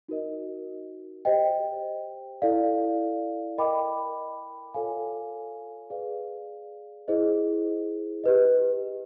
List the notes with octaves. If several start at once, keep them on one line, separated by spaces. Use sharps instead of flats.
D#4 F#4 A#4 D#5
G4 C5 D#5 G5
E4 A4 D5 F5
A#4 D#5 G5 B5 D6
F4 A4 C#5 F5 G#5
G#4 B4 D5 F5
E4 G#4 C5 D#5
G4 B4 D#5